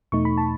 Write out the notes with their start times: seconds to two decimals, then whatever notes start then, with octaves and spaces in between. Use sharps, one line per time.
0.12 E2 B2 A3 D#4 C#6
0.25 B5
0.38 A5